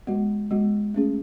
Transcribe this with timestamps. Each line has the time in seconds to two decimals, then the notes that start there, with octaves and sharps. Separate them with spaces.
0.07 G#3 B3 F#4
0.51 G#3 B3 F#4
0.94 A3 C#4 G#4